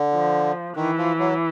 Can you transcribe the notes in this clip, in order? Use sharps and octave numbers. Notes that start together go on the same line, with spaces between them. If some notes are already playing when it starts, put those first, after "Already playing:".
Already playing: D3
F3
D#3 E3
F3
F#3